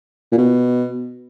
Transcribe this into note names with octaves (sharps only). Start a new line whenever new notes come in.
A#2
B2